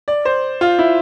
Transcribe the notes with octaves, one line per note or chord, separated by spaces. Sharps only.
D5
C5
F4
E4